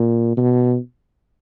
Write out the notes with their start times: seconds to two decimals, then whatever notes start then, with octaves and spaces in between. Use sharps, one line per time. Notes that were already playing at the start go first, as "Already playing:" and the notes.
Already playing: A#2
0.37 B2